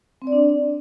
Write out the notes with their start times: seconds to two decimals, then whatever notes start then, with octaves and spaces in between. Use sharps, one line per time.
0.22 C4
0.27 D5
0.32 D4